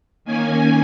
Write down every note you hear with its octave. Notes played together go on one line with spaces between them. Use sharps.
D#3 A#3 C#4 G#5